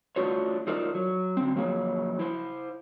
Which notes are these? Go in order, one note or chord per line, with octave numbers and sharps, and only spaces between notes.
A3 D4 F4 F#4 C5 C#5
D#4 F4 A4 A#4 C5 D5
F#3
D3 C4
F3 F#3 A#3 G#4 C#5
E4 C5